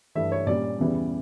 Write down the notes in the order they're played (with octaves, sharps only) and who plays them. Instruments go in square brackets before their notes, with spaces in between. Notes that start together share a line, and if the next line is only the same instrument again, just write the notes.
[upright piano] G2 E3 A3 E5
C#5
A#2 G3 C#4 D5
E2 C#3 E3 G3